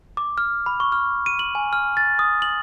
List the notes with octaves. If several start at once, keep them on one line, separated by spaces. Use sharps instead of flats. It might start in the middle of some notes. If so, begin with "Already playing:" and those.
D6
F6
B5
C#6
F6
D#7
F#7
G#5
F6
A6
D#6
F#7